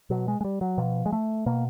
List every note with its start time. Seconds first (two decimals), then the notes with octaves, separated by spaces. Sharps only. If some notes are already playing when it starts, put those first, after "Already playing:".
0.10 B2 F#3
0.28 G#3
0.41 G#3
0.45 G3
0.61 F#3
0.78 B2 F3
1.06 G#3
1.13 A3
1.46 B2 A#3